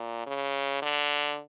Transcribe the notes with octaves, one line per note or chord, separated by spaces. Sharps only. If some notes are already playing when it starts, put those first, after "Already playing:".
Already playing: A#2
C#3
D3